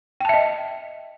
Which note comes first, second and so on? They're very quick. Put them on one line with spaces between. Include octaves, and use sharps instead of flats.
G5 A5 E5 D#5